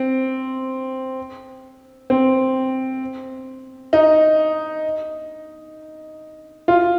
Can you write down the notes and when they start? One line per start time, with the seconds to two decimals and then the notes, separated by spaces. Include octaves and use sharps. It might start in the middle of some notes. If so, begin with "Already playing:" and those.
Already playing: C4
2.10 C4
3.93 D#4
6.68 F4